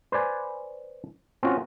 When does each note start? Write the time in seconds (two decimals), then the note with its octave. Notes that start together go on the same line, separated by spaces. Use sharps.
0.12 B4 C5 D5 G#5
1.43 C4 C#4 F4 F#4